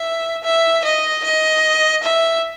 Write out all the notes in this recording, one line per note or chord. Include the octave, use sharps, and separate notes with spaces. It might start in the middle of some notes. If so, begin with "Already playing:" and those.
Already playing: E5
E5
D#5
D#5
E5